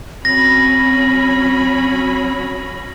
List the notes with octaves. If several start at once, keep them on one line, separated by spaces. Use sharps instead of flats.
F#3 C4 C#4 B5 A#6